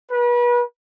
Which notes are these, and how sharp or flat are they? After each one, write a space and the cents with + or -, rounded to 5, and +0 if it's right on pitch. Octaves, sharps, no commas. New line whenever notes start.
B4 -35